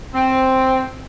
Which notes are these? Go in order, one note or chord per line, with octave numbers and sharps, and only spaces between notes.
C4